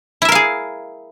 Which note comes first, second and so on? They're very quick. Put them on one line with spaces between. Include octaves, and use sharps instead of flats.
E4 E5 A#4 F5 G#4